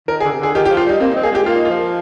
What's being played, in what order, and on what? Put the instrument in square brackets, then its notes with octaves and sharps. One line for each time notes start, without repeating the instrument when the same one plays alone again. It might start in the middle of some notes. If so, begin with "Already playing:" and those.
[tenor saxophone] D#3 [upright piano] A#4
[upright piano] G#4
[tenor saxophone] D3
C3
[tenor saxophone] D3 [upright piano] G#4
[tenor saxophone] D#3 [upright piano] G4
[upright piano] G4
[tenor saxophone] F3
[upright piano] F4
[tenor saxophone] G3 [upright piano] D#4
[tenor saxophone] A#3 [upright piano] C4
[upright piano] D#4
[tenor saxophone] C4
[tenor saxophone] A#3 [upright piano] G#4
[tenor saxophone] G#3 [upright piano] G4
[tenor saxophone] A#3 [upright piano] F4
[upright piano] D#4
[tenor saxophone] F3 [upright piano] F4